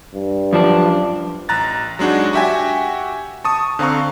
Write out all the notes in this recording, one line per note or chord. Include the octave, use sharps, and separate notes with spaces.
G2
F#2 F3 D4
A1 A#5 F#6 A6
F#3 G#3 D4 D#4 F#4
F#4 G4 E5 G5 G#5
A5 C#6 D#6
D3 C4 F5 A#5 C#6